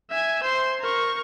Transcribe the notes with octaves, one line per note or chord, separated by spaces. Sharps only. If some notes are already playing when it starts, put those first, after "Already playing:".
E5 G#5
C5 C6
A#4 C#6